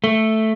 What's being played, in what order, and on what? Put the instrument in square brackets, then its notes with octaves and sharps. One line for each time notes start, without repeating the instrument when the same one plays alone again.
[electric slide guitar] A3